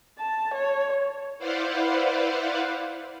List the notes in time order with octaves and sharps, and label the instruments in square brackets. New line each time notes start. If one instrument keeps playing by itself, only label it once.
[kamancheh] A5
C#5
[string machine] E4 B4 C5 D5 F5 F#5